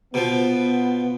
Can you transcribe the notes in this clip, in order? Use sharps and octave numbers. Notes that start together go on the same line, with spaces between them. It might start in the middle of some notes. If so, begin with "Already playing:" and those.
B2 F3 B3